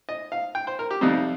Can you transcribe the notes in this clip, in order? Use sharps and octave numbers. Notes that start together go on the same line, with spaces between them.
D#5
F5
G5
C5
A#4
G4
F2 C3 G3 C4 D#4